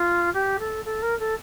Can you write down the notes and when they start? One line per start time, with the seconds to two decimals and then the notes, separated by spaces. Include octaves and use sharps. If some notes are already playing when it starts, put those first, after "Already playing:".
Already playing: F4
0.34 G4
0.59 A4
0.85 A4
1.02 A#4
1.19 A4